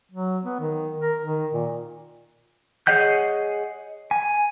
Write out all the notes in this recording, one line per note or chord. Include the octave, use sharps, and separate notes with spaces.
F#3
B3
D#3
A#4
D#3
A#2
G#4 C#5 D#5 F#5 G6
G#5